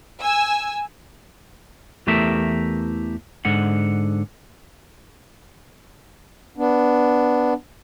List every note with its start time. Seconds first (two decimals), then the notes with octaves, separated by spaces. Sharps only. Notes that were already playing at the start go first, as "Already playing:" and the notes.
0.21 G#5 E6
2.07 E2 E3 A3 G4 A#4 E5
3.45 G#2 D3 F#5
6.57 B3 D4